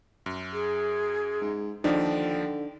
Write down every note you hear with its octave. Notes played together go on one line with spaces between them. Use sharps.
F#2
G#4
G#2
D#2 D3 F3 D4 D#4 G5